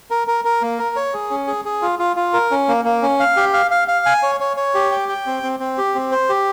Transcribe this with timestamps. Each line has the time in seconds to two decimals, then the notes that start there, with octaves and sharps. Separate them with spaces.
0.11 A#4
0.28 A#4
0.45 A#4
0.62 A#3
0.79 A#4
0.96 C#5
1.14 G#4
1.30 C#4
1.47 G#4
1.65 G#4
1.82 F4
1.99 F4
2.16 F4
2.34 A#4
2.51 C#4
2.68 A#3
2.85 A#3
3.03 C#4
3.20 F5
3.37 G4
3.53 F5
3.71 F5
3.88 F5
4.06 G#5
4.23 C#5
4.40 C#5
4.57 C#5
4.75 G4
4.92 G5
5.09 G5
5.26 C4
5.43 C4
5.60 C4
5.78 G4
5.95 C4
6.12 C5
6.29 G4